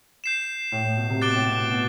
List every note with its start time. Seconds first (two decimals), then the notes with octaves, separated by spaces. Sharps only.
0.24 G6 C7 E7
0.72 A2
0.85 A2
0.97 B2
1.10 C3
1.21 B2 D6 F#6 A6 D7 G7
1.34 A2
1.46 B2
1.71 B2